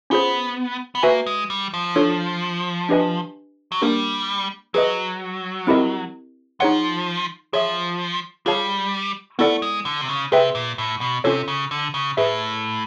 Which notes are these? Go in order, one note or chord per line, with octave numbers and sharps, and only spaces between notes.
B3 C#4 F4 G#4 C5
B3
A#3 F#4 B4 E5 G#5
G#3
G3
F3
D4 F4 A4 C#5
D4 G4 B4 D#5 G#5
F#3
G3 A#3 D4 G4 A#4
F#3 G#4 B4 D#5
C4 E4 G4 A#4 D#5
F3 D#4 G#4 C#5 F#5
F3 G#4 C#5 E5
G3 F4 G#4 C#5 F5 A5
A3 B3 E4 A4 D5 F#5
G#3
D3
C3
C#3
C3 G#4 B4 E5 G5
A#2
A2
B2
C3 C#4 F4 A4 C#5
C#3
D3
C#3
A2 G#4 B4 E5